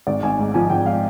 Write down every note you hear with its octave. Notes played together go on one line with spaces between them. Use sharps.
G#1 D5
G#1 G#5
G#2
F3 G#5
G#1 G5
F5